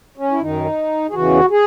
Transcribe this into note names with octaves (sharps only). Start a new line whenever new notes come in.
C#4
E4
F#2 D#3 D#4
G#4
E2 C#3 E3 F#4
G#4